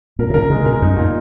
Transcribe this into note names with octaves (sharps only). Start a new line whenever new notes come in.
A#2 A#4
B2
C#3 A#4
C#3 G#3
B2 A#4
F#2 D#4
A#2